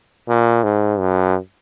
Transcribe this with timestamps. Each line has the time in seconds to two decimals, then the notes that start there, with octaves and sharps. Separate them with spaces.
0.29 A#2
0.64 G#2
0.99 F#2